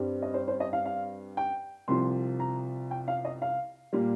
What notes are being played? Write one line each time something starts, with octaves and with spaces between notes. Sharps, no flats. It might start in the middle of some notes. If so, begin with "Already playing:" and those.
Already playing: G2 G3 C4
D#5
C5
C5
D#5
F5
F5
G5
C2 C3 F3 C6
A#5
G5
F5
D#5
F5
A#2 G3 A#3